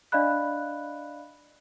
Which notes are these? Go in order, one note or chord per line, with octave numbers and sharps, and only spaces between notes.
D4 D5 D#5 F5 B5 F#6